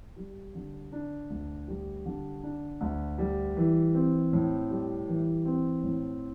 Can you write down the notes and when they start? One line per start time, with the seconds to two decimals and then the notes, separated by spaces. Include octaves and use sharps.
0.16 G3
0.55 D3
0.92 D4
1.30 D2
1.68 G3
2.05 D3
2.43 D4
2.81 D2
3.18 G3
3.57 E3
3.94 C4
4.33 A2
4.70 G3
5.08 E3
5.45 C4
5.83 A2